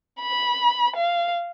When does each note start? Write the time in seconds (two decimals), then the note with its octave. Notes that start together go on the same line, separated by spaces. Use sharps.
0.20 B5
0.96 F5